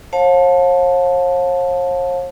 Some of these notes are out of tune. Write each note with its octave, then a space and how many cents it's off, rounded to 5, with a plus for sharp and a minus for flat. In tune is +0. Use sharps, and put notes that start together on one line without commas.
C#5 -45 F5 +35 A5 +0